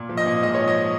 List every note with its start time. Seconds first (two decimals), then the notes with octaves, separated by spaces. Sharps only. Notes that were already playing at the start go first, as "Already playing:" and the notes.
Already playing: A#2
0.09 F3
0.17 D#5
0.25 A#2
0.42 G#2 D#5
0.55 C#5
0.60 F3
0.67 D#5